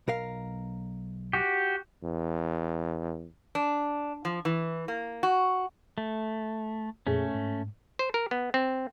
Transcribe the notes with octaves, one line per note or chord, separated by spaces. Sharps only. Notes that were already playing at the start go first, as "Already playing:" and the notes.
B1 A#4 F5
F#4 G4
E2
D4
F3
E3
A#3
F#4
A3
F2 A#2 A3 C#4 G#4
G#2
C5
A#4
B3
C4